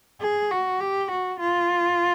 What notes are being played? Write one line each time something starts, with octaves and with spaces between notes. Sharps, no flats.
G#4
F#4
G4
F#4
F4